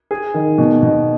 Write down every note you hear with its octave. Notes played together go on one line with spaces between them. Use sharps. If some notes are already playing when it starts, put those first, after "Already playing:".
G#4
D#3
B2
B2